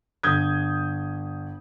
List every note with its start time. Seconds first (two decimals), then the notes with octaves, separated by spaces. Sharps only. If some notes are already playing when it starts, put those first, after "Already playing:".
0.23 G1 D#6 G6 G#6